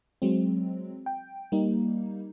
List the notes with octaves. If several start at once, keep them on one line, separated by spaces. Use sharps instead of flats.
F#3 G#3 C4
G5
G3 A#3 D#4